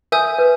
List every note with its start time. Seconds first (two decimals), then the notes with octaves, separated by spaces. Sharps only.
0.12 A#4 E5 G#5 D#6 G6
0.39 B4